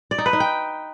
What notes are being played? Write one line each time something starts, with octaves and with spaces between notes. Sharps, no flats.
D5
D#4
B4
D#4
G5